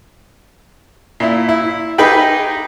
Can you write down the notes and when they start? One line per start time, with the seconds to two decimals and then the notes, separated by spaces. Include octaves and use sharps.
1.20 A#2 E4
1.49 E4
1.98 D#4 G4 G#4 B4 G5 B5